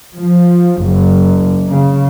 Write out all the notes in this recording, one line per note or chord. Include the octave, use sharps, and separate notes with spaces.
F3
F#1
C#3